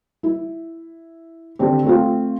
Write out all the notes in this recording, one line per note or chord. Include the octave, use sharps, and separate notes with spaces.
E4
D3 C4 G4
A3 C4 F4